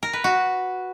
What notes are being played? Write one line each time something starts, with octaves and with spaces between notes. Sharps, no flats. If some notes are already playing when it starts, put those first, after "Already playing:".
A#4
B4
F#4